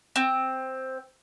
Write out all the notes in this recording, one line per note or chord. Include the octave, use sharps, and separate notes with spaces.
C4